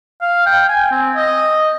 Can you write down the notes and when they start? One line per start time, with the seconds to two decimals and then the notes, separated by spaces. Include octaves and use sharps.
0.22 F5
0.46 G5
0.69 G#5
0.91 C4
1.16 D#5